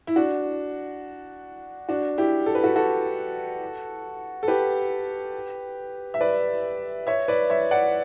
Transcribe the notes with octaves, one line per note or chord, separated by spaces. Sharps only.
E4
D4 F#4
D4 F#4
E4 G4
A4
B4
F#4 A4
F#4 A4
A4
G4 B4
E5
B4 D5
C#5 E5
B4 D5
C#5 E5
D5 F#5